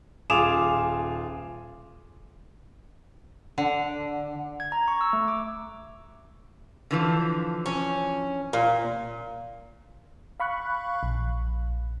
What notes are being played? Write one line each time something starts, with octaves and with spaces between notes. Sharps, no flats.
D#1 F4 G#4 D6 E7 F7
D3
G#6
A#5
C#6
E6
A3
D6
D3 E3 F3
C#4
A#2
F5 B5 C#6 F#6
A#1